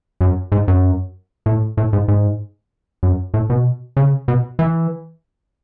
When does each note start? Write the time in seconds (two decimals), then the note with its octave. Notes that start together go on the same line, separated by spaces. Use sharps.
0.21 F#2
0.52 G#2
0.68 F#2
1.46 A2
1.77 A2
1.93 G#2
2.08 G#2
3.03 F#2
3.34 A2
3.50 B2
3.97 C#3
4.28 B2
4.59 E3